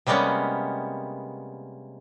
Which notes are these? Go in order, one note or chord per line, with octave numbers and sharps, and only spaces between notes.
C3 G3 G#3 A#3 B3 C#4